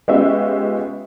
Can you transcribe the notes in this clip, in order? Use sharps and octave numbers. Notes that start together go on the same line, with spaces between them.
G#3 B3 C#4 F4 G4 E5